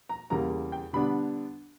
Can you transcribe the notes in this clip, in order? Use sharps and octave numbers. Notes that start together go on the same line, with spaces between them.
A#5
E2 C#3 G3 A#3 A#5
G5
D3 G3 B3 D4 B5